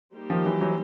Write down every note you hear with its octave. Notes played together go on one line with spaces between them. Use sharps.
G3 A#3 D#4 G4 C5
D#3 F3
E3 F#3
E3 F#3